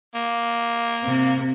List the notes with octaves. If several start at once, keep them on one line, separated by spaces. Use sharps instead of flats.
A#3
C3